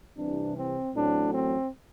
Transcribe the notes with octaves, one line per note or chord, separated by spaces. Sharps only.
C2 C3 E3 D4
C4
A1 A2 F#3 C4 D4
C4